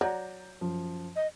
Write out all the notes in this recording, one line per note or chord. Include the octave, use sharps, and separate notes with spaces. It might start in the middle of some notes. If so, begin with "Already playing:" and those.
F#3 D5 A#5 G6
F#2 F3
D#5